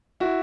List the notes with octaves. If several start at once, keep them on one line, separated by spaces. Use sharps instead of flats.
E4 F#4